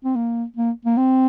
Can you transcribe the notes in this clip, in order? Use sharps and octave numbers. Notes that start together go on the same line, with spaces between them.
C4
A#3
A#3
A#3
C4